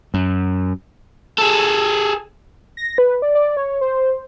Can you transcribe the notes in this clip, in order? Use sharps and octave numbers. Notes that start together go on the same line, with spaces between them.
F#2
G#4 A4
A#6
B4
D5
D5
C#5
C5